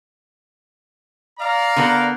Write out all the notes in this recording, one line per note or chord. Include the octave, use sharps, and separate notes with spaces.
D5 F5 A#5
D3 B3 A#4